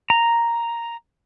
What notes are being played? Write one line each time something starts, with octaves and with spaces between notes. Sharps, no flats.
A#5